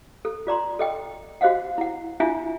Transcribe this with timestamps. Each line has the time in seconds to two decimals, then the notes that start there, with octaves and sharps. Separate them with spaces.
0.25 A4
0.47 F4 D5 A#5 C6
0.79 A4 D#5 G5
1.41 F#4 C5 D#5 F5 F#5
1.78 E4 F#5
2.20 D4 E4 F4 E5 G#5